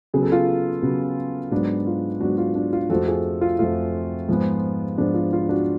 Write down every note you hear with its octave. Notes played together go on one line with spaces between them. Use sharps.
C#3 F#3 B3 G#4
A4
F4 G#4
C#3 F#3 B3
G#2 F#3 B3 D4
F4
G#2 F#3 B3 D4 F#4
F4
D4
F4
F2 F3 A3 F#4 A4
F4 G#4
F4
F2 F3 A3 F4
G#2 F3 G#3 B3
G#2 F3 G#3 B3 D4
F4
F4
D4 F#4